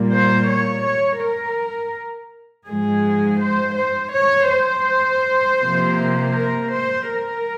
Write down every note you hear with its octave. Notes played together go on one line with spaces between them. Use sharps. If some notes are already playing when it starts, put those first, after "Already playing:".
Already playing: A#2 G3 A#3
C5
C#5
C#5
A#4
G#2 F3 G#3 G#4
C5
C5
C#5
C5
C3 F3 A#3
A#4
C5
A#4